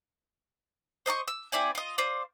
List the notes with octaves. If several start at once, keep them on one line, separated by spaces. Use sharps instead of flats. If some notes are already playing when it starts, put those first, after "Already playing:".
C5 D#5 A5 C#6
E6
C4 E4 D5 G#5
F4 D#5
F4 C5 D5